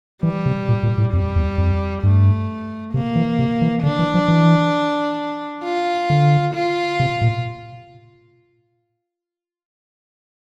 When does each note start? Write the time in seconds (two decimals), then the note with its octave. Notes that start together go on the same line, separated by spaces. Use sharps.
0.23 E3 G3
0.46 C3
0.69 A#2
0.83 A#2
0.98 A2
1.13 F2 G3
1.36 E2
1.58 F2
2.03 G2 A3
2.93 C3 A#3
3.16 E3
3.39 C3
3.62 E3
3.83 D3 D4
3.99 E3
4.14 F3
4.28 E3
5.64 F4
6.10 D3
6.54 F4
7.00 C3
7.21 A#2